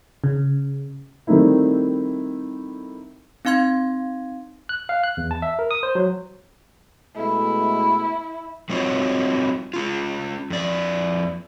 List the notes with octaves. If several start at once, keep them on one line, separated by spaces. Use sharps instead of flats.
C#3
D#3 G3 A3 C4 D#4 E4
C4 D#4 F5 C6 G#6
F#6
F5
F#6
E2
A5
E5
A#4
D#6
C5
F#3
B2 G#3 A3 E4
G3 C4 D#4 F4 F#4 C#5
C#4 F4
F2 D5